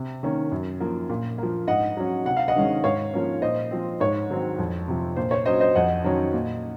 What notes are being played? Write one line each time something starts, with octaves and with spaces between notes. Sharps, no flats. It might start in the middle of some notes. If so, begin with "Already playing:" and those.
Already playing: C3
D#3 A#3 C#4
F#2
F3 A#3
A#2
F3 A#3
G#2 D#5 F#5
F#3 C#4
C3 F#5
F5
D#5 F#5
D#3 G#3 C#4
G#2 C#5 F5
F3 A#3 C#4
A#2 C5 D#5
F3 C4
G#2 C#5
D#3 F#3 C4
F2
C3 F3
A#2 C5
C#5
F#3 C#4 C5 D#5
C5 D#5
F2 D#5 F#5
D#3 F#3 C#4
A#2